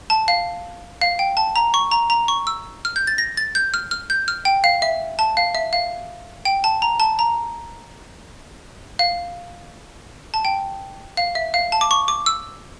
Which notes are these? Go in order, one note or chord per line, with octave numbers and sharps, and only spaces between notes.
A5
F5
F5
G5
A5
A#5
C#6
A#5
A#5
C#6
E6
F6
G6
A6
A#6
A6
G6
F6
F6
G6
F6
G5
F5
E5
A5
F5
E5
F5
G5
A5
A#5
A5
A#5
F5
A5
G5
F5
E5
F5
A5
D6
C#6
D6
E6